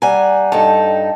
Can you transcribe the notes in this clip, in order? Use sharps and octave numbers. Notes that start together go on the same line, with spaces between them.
G3 D5 F#5 G#5 A#5
G2 D#4 A4 G5 A5